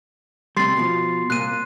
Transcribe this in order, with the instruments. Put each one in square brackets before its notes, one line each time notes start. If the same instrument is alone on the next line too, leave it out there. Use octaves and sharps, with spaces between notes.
[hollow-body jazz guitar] C3 G3 [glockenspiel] C6 A6 C7
[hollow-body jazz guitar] B2 F3
[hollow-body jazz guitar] C2 A#2 [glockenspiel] F#6 D#7